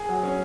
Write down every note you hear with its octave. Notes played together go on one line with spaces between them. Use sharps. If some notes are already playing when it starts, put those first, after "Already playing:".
Already playing: G#4
F#3
C#4